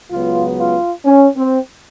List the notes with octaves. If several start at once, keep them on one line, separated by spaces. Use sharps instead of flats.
C#2 C#3 F#3 B3 F4
F4
C#4
C4